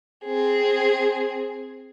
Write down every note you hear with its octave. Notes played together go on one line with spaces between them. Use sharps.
C4 G#4